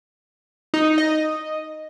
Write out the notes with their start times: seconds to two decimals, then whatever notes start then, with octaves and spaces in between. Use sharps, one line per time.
0.74 D#4
0.98 D#5